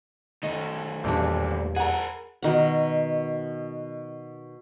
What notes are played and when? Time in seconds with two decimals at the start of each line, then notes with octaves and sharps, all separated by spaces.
0.43 D#3 A3 D#5
1.04 A1 E2 A#2 G3 D4
1.76 G#4 A#4 F#5 A#5
2.42 B2 D#3 F#5